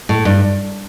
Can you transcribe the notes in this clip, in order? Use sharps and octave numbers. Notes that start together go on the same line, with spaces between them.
A2
G2